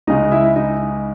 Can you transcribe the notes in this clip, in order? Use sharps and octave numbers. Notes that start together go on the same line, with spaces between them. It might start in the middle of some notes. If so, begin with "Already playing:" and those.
C#2 C#3 G#3 D#4 D#5
E4 E5
D#4 D#5